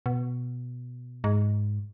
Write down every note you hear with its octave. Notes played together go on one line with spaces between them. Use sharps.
B2
G#2